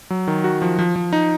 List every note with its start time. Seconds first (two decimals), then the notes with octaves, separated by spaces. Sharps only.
0.10 F#3
0.28 D#3
0.44 F#4
0.62 F3
0.79 F3
0.96 F3
1.13 D#4